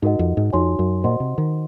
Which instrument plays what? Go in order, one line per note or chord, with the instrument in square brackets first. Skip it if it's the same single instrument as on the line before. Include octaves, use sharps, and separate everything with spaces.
[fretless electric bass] G#2 [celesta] D#4 F#4 A#4 D#5 F#5
[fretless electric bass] F2
G#2
[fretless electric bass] F2 [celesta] D#4 F#4 C#5 G#5 C6
[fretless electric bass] F#2
[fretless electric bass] A#2 [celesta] F#4 C5 D#5 F#5 C6
[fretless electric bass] C3
D#3